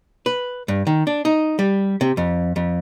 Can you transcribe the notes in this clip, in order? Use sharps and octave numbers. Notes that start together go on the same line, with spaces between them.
B4
G2
D#3
D4
D#4
G3
C3
F2
F2